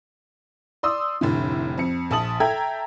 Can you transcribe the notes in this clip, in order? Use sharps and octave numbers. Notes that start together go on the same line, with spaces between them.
D5 C6 D#6 E6
F1 A2 D3
F2 C#7
A#1 A5 D#6 F#7
A4 E5 G5 A#5 G#6